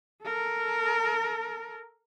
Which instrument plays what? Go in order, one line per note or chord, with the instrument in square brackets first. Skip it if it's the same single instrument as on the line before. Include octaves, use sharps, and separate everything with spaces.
[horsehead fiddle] A4 A#4